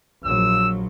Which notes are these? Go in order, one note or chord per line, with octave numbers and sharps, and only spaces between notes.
A#1 F3 F#3 E6